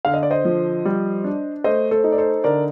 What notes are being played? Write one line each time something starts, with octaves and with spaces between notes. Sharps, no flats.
D3 F5
D#5
D5
C5 D#5
F3
G3
D4
A3 C5 D#5
A4 C5
D#4
D5
A4 C5
D3 A#4 D5